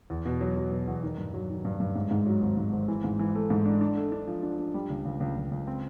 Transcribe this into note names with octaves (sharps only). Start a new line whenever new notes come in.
E2
B2
F#3
F#3
B2
E2
D#3
G2
F#3
D#3
G2
G2
G#2
G#2
F#3
G#1
G#2
G#1
E3
G#2
E3
A3
G#2
D4
D4
A3
D4
F3
D4
D4
G3
C#2
C#2
C#2
C#2
C#2
C4